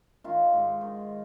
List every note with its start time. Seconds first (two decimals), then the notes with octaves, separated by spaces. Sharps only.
0.24 D#3 F4
0.53 G#2
0.81 D#3